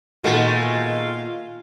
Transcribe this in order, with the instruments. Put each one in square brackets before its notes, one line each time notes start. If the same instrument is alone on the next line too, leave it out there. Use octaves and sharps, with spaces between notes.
[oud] A#2 B3 F#4 [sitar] D#3 G#3 A3 [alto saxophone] F4